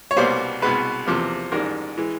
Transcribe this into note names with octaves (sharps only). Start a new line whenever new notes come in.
C#5
C2 B2 G3 A#3 C5
C2 B2 G#3 B4
E2 C3 F3 A#3
A1 G#2 D#3 G3 A#4
E3 G#3